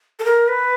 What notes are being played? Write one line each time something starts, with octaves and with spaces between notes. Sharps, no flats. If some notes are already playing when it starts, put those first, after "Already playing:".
A4
A#4
B4